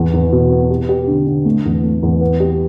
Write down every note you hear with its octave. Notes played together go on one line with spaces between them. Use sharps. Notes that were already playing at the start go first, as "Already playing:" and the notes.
Already playing: E2
E2
B2
B3
G4
G4
D3
D3
A3
E2
A3
E2
B3
G4